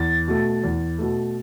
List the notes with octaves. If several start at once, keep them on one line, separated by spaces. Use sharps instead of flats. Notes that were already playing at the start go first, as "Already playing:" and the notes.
Already playing: E2 A6
B2 A3
E2
B2 A3